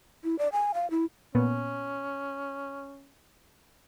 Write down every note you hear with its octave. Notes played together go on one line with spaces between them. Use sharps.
E4
D5
G#5
F5
E4
A#2 B3 C#4